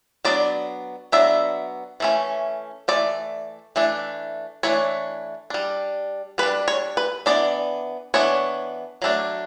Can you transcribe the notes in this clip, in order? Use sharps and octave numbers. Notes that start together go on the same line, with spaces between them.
F#3 B3 D4 D5
F#3 B3 D4 E5
E3 A3 C#4
E3 A3 D5
E3 A3 D4
E3 A3 D4 C#5
G3 D4
G3 D4 B4
C#5
B4
E3 B3 D4 D5
E3 B3 D4 C#5
F#3 A3 D4